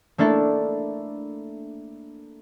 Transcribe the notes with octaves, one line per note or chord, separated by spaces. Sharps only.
A3 A#3 D4 E4 A4